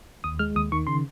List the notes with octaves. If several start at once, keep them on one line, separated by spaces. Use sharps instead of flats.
D#2 D#6
G#3 F6
D#2 D#6
D#3 C#6
C#3 C6